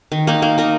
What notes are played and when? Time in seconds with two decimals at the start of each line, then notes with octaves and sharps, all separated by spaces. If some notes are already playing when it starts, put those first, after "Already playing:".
0.12 D#3
0.27 A#3 D#4
0.42 A#3
0.58 D#4 A#4